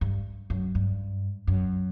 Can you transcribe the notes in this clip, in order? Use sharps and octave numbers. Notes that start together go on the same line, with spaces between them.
G2
F#2
G2
F#2